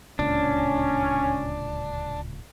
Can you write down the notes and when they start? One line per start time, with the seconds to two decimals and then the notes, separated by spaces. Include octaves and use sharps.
0.19 D1 C#2 A#2 C#4 D4